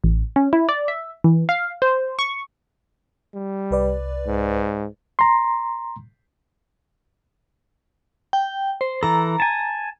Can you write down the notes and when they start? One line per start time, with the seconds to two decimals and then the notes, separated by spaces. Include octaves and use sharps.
0.04 A1
0.36 C#4
0.53 E4
0.69 D5
0.88 E5
1.24 E3
1.49 F5
1.82 C5
2.19 C#6
3.35 G3
3.71 C2 B4 D5
4.27 G#2
5.19 A#5 C6
8.33 G5
8.81 C5
9.03 E3 A4 A#5
9.40 G#5 A5